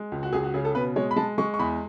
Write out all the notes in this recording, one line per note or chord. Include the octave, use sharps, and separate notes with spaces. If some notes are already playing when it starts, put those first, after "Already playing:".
Already playing: G#3
C#2
F#4
C#2 G#4
F#4
C#3 G#4
A4
B2 B4
G#3 C#5
B5
G#3 A5
G#3 C#6
C#6
E2 B5